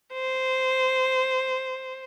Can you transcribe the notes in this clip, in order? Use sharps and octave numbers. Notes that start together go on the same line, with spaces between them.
C5